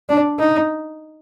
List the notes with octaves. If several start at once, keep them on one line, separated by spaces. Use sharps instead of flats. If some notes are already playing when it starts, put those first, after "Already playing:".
D4
D#4